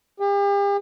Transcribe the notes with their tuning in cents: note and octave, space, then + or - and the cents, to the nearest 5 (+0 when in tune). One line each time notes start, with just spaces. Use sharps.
G4 +40